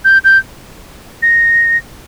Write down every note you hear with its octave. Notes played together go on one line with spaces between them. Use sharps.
G6
G6
A#6